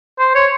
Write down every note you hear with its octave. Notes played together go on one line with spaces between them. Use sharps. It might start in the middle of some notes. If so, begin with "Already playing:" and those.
C5
C#5